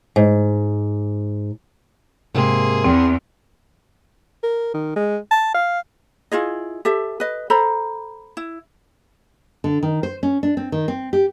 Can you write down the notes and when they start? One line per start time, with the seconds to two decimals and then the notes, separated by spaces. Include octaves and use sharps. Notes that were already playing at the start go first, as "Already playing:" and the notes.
0.16 G#2
2.34 G#2 C3 A#3 G#4 C6
2.84 E2 C4 G5
4.43 A#4
4.74 D#3
4.96 G#3
5.31 A5
5.54 F5
6.32 E4 F4 G#4 D#5
6.85 G4 A4 E5
7.20 B4 D#5
7.50 A4 C5 A#5 B5
8.37 E4
9.64 D3
9.83 D#3
10.03 C5
10.23 C#4
10.43 D4
10.57 C4
10.72 D#3
10.88 C4
11.13 G4